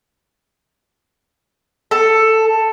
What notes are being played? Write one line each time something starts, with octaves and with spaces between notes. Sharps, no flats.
A4